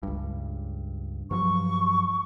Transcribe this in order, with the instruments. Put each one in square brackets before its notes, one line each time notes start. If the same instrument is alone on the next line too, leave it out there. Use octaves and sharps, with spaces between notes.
[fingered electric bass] C#2 G2
[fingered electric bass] G2 F3 F#3 [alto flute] C#6